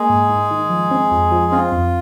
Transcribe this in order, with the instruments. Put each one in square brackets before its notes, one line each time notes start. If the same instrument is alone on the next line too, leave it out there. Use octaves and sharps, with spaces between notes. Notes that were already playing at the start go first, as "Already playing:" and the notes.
Already playing: [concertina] G#3 G#4 [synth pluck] A#3
[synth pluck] G#2
G#2
D#3
F3
C4
F2
F3
[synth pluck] C4 [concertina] F4
[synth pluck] F2